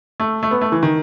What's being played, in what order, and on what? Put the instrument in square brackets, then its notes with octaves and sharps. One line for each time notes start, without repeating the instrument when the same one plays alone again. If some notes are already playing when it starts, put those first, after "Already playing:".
[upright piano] A3
A3
B3
A3
E3
D#3